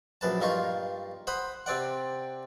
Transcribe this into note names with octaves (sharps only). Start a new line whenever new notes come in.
A#1 F#2 B4 A5
G2 A#3 D#4 F4 C#6
C5 F#5 B5 D#6
C3 C4 D5 F#5